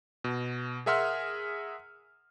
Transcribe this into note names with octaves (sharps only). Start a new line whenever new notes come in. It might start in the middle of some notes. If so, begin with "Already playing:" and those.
B2
G#4 A#4 E5 F#5 C6 F6